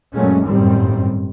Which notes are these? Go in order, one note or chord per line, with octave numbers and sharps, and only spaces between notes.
F#2 A#2 F#3 G#3 A3 C#4
G1 F#2 A2 D#3 G3 C4